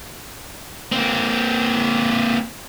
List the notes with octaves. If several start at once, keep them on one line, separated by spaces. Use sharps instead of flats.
A#3 C4